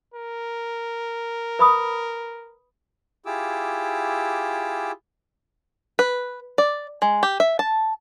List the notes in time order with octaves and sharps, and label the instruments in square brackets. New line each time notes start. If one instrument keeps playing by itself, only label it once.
[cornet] A#4
[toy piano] B4 B5 D#6
[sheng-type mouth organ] E4 F4 G4 G#4 D6 E6
[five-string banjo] B4
D5
G#3
G4
E5
A5